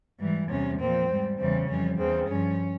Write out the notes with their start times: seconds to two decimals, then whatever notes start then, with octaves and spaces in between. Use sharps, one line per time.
0.19 G#2 E3 G3
0.48 E2 C3 G3 C#4
0.79 A#2 F3 C4
1.09 G#2 G3
1.38 E2 C#3 E3 G3 C4
1.68 F2 E3 G3 C#4
1.97 E2 C#3 E3 C4
2.27 G2 F3 C#4